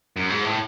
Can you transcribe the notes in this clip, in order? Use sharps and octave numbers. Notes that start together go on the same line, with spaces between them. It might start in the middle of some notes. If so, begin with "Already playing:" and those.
F#2
G#2
A2